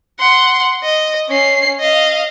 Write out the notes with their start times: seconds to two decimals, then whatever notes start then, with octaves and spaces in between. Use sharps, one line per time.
0.19 F#5 C6
0.83 D#5
1.29 C#4 C7
1.80 D#5 F5